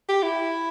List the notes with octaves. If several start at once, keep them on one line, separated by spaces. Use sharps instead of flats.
G4
E4